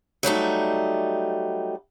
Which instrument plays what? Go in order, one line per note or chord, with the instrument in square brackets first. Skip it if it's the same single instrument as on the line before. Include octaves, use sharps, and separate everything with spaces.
[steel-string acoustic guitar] F#3 G3 A3 D#4